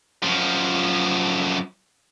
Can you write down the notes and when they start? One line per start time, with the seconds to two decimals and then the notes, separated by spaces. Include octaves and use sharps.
0.23 F#2 F3